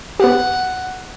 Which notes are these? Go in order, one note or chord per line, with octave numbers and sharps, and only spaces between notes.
B3 G4 F#5